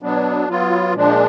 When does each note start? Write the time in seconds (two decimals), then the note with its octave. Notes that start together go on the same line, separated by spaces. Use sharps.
0.02 B2 F#3 B3 D4
0.48 F#3 B3 F4
0.94 A#2 F3 G#3 D4